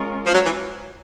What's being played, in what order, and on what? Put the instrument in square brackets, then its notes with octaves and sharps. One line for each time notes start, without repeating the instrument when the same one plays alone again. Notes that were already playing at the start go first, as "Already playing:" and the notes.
Already playing: [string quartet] G#3 C#4 F4 A#4
[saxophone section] F3
F#3
E3